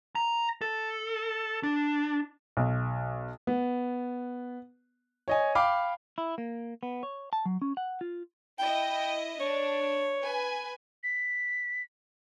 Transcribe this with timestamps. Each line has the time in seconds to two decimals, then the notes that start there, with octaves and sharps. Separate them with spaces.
0.15 A#5
0.61 A4
1.63 D4
2.57 B1
3.47 B3
5.28 C#5 D#5 G#5
5.55 F5 G5 B5 D6
6.18 E4
6.38 A#3
6.83 B3
7.03 C#5
7.33 A5
7.46 F#3
7.62 C#4
7.77 F#5
8.01 F4
8.59 E4 D#5 G5
9.40 D4 C#5
10.22 B4 G#5
11.04 B6